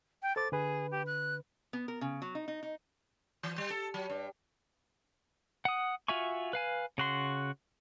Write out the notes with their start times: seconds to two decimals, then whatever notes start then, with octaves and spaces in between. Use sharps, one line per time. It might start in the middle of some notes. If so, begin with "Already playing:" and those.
0.23 G5
0.36 A4 C5 D6 A6
0.52 D3 G#4 B4
0.91 G4
1.07 F#6
1.73 B3
1.88 A#4
2.01 C#3
2.22 F#3
2.35 D#4
2.48 D#4
2.63 D#4
3.43 E3
3.58 G3
3.70 A4
3.94 F#3
4.10 G2
5.65 F#5 D#6
6.08 F4 F#4 E5 G#5 C#6
6.53 B4 F5 G#5
6.98 C#3 F#4 C6